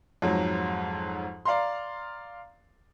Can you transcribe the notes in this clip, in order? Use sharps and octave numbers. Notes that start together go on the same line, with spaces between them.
F2 G#2 F#3
D5 F5 A#5 C6